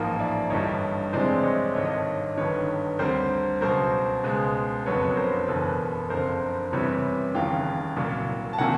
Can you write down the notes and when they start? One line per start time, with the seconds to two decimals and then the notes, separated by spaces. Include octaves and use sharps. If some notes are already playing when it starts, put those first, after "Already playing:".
Already playing: A1 G#2 F3 A#3 A#5
0.19 D5 E5
0.50 G1 G2 E3 G3 C#5 D#5
1.13 F2 C3 E3 G#3 C5 D5
1.39 D5
1.43 C#5 D#5
1.75 G#1 G2 D3 C#5 D#5
1.85 C#5 D#5
2.37 G1 G2 D#3 B4 C#5
2.99 D2 D3 G3 C4 A#4 C5
3.61 C#2 B2 F#3 A#4 C5
4.24 C#2 B2 G#3
4.86 F#1 F2 D3 F#3 B3 B4 C#5
5.17 A#4 C5
5.48 F#1 E2 B2 A4 B4
6.10 F#1 F2 D3 A#4 C5
6.72 E2 C3 E3 G3 B4 C#5
7.34 F1 D#2 C#3 E3 F5 G5
7.97 C2 A#2 F#3
8.53 A5
8.58 C3 D#3 F#3 A#3 F#5 G#5